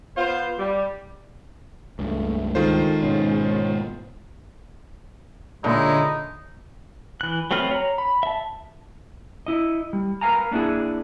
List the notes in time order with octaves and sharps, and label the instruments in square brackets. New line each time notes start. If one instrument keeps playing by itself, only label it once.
[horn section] B3 F4 C5
G3
[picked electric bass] C#2 G2 [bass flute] A3
[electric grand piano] D#3 F4 C5 [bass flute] G#3 [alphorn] A4
[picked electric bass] G#2 B2 [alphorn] C#4
[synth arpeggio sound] A#2 D3 [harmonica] G#3 C#4 E4 [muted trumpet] D#4
[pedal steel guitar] E3 F#6
F#3 A3 C4 B4 F6
C#5 A#5
B5
E5 A5
[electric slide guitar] E4 D#5
G3
A#4 B4 E5 F5 G#5 A#5
A#3 D4 E4 F#4 G#4